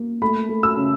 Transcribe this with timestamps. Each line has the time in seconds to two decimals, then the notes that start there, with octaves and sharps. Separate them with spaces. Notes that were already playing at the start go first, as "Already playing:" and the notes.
Already playing: A#3
0.22 A3 B5
0.49 A3
0.63 E6
0.77 C#3